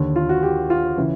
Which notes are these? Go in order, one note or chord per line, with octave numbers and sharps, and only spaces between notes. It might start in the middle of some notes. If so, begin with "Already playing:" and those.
Already playing: D#2 D3
F4
F#4
G4
F4
C#3 E3